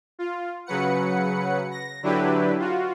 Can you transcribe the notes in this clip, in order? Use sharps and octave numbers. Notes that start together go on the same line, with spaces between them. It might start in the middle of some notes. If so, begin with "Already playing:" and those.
F4
C#3 F#3 B4 F#5 C#7
A#6
D3 F#3 D4 E4 G4 B4
F4 F#4